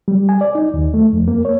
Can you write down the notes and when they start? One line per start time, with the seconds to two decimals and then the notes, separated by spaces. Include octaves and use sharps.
0.08 G3
0.29 G#5
0.41 D5
0.55 D#4
0.74 D#2
0.94 A3
1.13 F2
1.28 A#3
1.45 C#5